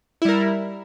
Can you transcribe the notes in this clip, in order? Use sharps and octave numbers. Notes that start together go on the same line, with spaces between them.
G3 E4 A#4